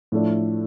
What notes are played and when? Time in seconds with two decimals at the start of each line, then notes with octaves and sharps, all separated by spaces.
0.12 A2 F3 A3 D4